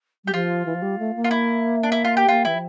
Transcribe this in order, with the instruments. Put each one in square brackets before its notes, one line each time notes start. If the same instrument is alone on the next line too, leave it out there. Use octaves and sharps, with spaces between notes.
[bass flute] G3 [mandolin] G4
[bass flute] F3 [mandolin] F4
[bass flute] E3
F3
G3
A3
A#3
[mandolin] F4
E4
D4
E4
F4
G4
[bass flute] A#3 [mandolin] F4
[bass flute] E3 [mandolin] E4
[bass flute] F3